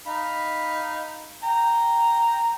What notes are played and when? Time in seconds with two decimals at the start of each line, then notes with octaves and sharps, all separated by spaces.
0.07 D#4 F5 B5
1.43 G5 A#5